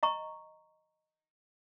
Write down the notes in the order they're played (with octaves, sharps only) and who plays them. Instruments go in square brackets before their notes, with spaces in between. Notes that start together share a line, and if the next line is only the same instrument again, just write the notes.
[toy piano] D#5 A#5 C#6